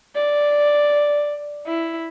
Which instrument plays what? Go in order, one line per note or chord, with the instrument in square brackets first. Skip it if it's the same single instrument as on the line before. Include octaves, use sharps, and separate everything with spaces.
[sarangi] D5
E4